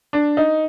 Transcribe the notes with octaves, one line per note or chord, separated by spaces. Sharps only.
D4
D#4